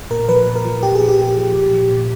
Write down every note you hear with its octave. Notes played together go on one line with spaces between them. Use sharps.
A#2 A#4
F3 B4
A#2
A#4
F3
A#2 G4
G#4
F3
G4
A#2
F3
A#2
F3
A#2